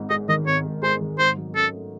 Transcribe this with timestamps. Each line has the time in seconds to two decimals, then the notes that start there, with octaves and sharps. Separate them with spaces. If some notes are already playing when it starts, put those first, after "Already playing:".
Already playing: G#1 G#2
0.10 G#3 D#5
0.29 D#3 D#5
0.46 G#1 C#5
0.65 G#2
0.82 G#3 C5
1.01 D#3
1.19 G#2 C5
1.37 F#3
1.55 C#4 A4
1.73 A3